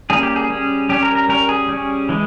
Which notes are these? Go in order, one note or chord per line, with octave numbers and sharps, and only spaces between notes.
G3 A#3 C#4 G#4
G4
G#4
G3 C#4
G3 C#4 G4
A#4
A#4
G3 C#4 A#4
G#4
G3 C#4
E3 G#3